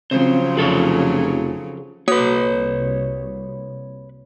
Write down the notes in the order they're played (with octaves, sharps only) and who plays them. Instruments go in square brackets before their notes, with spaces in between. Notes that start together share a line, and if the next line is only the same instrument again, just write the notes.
[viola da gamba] C#3 F3 F#3 [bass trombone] C4 [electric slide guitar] C5
[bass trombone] F1 [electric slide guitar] G#4 A4 C#5
[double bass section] C2 [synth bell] A#3 F#4 D#6 [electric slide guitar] B4 C#5